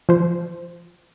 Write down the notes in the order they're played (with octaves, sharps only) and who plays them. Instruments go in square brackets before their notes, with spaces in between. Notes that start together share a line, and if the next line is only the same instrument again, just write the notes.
[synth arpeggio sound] F3 C5